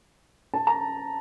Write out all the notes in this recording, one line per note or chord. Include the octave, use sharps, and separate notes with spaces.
A5
A#5